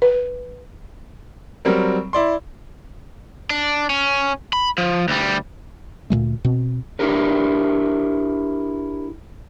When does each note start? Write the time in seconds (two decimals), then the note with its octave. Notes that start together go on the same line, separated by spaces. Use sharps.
0.02 B4
1.65 F#3 G3 C4 A#4
2.13 E4 D5 C6
3.50 D4
3.90 C#4
4.53 B5
4.78 F3
5.08 D2 G3
6.10 D2 A#2 G3 A3
6.45 B2 C4
6.99 D4 E4 G4 A#4 B4